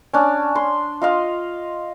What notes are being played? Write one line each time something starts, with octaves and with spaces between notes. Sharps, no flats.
C#4 D4
C6
F4 D#5 F5